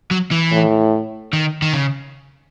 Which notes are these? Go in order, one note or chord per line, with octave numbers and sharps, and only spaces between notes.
F#3
E3
A2
D#3
D#3
C#3